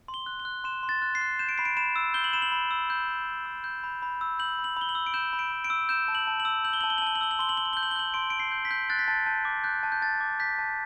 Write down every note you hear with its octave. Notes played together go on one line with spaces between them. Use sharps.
C6
G7
F#6
G7
F#6
C6 E7
C6
A6
F#6
C7
F#6
G6 E7
D7
B5 C7
D7
B5 E7
E6
G6 G7
F#7
B5 E7
F#7
B5
E6
G6
B5
B5
E6
G6
B5
B5
E6
G6 F#7
B5
F#7
B5 G7
F#7
E6
D7
G6 E7
B5
D7
B5
D7
E6
G6 E7
A5
F#7
A5
F#7
E6
G6 F#7
G7
A5 F#7
G7
F#7
A5 G7
F#7
E6 G7
F#7
C6 G7
F#7
C6 G7
F#7
G7
G6
F#7
G7
G6 F#7
C6 D7
C6 D7
C7
G6
B6
G6
F#6 A6
B6
A5 A6
A5 G6
D6
F#6 G6
A5
G6
A5 A6
D6
G6 B6
A5